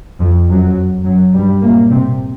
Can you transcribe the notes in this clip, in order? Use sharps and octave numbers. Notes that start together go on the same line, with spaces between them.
F2 F3
F#2 F#3
F#2 F#3
G2 G3
A#2 A#3
C3 C4